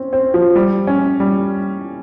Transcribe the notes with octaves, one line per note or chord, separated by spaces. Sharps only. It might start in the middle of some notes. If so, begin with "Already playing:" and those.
Already playing: C4 C#4
C4
F3
G3
C#4
G3